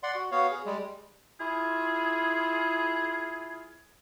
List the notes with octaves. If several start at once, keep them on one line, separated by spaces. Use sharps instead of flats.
D5 F#5 C6
F#4
B3 F#4 C#5 F5
G#4
G3 G#3
E4 F4 G#4